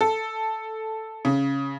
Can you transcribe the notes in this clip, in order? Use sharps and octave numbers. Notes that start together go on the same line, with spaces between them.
A4
C#3